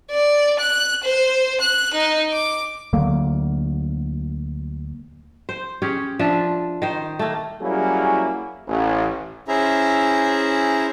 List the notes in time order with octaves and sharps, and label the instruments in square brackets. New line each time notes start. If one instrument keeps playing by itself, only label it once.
[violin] D5
F#6
C5
F#6
D#4
D6
[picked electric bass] D2 D3 F#3 A#3
[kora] C5
C#4 G4 G#4 C#5
F3 D4 E5
D#3 C5
A3 A#3
[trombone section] F#3 G3 A#3 C#4 E4 G#4
A1
[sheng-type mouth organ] C#4 E4 G#4 C5 E5 A#5